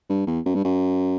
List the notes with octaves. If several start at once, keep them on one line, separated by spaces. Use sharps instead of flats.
G2
E2
F#2
G2
F#2